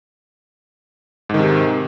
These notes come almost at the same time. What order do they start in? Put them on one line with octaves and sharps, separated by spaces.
G#2 D#3 C3